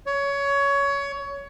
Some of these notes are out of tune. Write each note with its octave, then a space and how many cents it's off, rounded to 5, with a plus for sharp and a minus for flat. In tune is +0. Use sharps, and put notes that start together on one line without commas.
C#5 +20